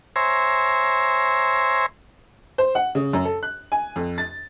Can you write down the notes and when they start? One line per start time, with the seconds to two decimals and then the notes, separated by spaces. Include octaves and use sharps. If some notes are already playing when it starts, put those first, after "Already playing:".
0.16 C5 C#5 E5 G#5 A#5 C6
2.58 C5
2.75 F#5
2.95 C#3
3.13 F#2
3.25 A4
3.43 F#6
3.72 G#5
3.96 F2
4.18 A6